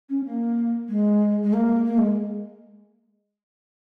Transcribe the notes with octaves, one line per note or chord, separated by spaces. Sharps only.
C#4
A#3
G#3
G#3
A#3
A#3
G#3